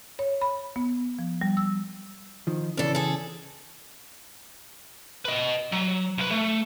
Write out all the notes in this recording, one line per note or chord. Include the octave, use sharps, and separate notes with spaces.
C#5
B5
B3
F3
G3
E6
D#3 F3
C#3 E3 C#4 D4 A4
G#4 A4
B4 D#5
F#3
C2 B4
A3